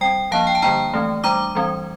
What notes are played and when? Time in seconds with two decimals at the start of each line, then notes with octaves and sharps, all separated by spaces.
0.01 G3 C4 G5
0.31 F3 A#3 D4 F5 A5
0.47 G5
0.55 A5
0.62 D3 G3 A#3 D4 G5 A#5
0.93 E3 A3 C4
1.24 G3 D4 A#5 D6
1.55 E3 G3 C4